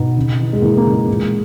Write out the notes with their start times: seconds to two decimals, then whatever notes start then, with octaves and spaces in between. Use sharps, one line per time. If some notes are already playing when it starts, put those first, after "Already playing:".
Already playing: B2 B3 D#4
0.17 C#3
0.39 E3
0.53 G#3
0.62 E3 A#3
0.77 A#3
0.85 C#3
0.93 G#3
1.08 A#2